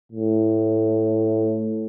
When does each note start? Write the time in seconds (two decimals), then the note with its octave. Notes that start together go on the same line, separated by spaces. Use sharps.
0.12 A2